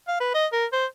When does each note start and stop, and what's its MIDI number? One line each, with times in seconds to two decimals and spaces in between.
0.08 0.17 77
0.20 0.30 71
0.34 0.47 75
0.53 0.65 70
0.72 0.85 72